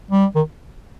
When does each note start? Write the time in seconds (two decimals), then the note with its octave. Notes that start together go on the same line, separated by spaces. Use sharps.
0.11 G3
0.35 D#3